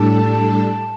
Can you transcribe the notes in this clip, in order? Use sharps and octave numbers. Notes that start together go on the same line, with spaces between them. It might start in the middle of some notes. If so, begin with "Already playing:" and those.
Already playing: A2 G3 D4 A4 A5